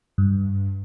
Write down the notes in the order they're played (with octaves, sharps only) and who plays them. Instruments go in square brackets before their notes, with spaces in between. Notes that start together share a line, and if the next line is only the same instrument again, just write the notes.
[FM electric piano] G2